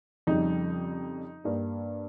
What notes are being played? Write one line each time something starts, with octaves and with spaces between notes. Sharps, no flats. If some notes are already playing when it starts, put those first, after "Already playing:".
F2 C#3 G3 D#4
G2 G3 A#3